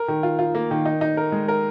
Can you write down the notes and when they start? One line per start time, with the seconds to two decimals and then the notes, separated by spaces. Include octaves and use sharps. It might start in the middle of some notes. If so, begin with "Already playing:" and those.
Already playing: A#4
0.08 D#3
0.23 F4
0.39 F4
0.55 A#3
0.71 D#3
0.85 D#4
1.01 D#4
1.17 A#4
1.32 G#3
1.48 A#4